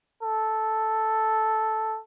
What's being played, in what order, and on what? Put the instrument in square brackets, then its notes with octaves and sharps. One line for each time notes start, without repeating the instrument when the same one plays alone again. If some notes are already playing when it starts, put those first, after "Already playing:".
[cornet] A4